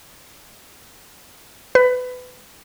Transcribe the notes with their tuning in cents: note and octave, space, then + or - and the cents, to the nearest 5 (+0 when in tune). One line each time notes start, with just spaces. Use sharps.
B4 +20